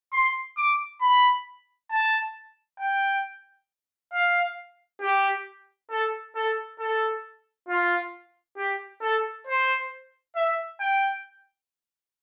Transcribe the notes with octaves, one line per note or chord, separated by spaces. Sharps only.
C6
D6
B5
A5
G5
F5
G4
A4
A4
A4
F4
G4
A4
C5
E5
G5